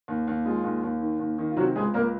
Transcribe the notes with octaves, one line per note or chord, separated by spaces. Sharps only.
D#2
D#2
G#3 F4
D#2
D#2
D#3
D#2
D#3
F4
C3 F#3 F#4
C#2 G#3 G#4
C#2 A#3 A#4